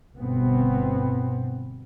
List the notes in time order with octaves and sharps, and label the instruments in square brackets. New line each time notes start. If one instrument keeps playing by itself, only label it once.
[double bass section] G1 B2 B3 C4